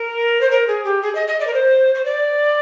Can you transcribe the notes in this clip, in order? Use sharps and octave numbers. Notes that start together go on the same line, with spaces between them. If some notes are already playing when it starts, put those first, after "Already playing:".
Already playing: A#4
C5
A#4
G#4
G4
G#4
D#5
D#5
D5
A#4
C5
C5
D5